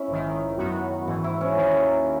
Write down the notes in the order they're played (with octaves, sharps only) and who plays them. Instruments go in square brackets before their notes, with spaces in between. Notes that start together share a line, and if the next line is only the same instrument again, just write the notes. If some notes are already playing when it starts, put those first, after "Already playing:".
Already playing: [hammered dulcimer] C#4 E4
[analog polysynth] A#1 G#2 D#3
F#2 D#3 F#3 B3 F#4
[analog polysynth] G#1 G#2 E3 [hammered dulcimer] F#4
[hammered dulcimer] E4
C#4
[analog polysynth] D#2 D#3 A#3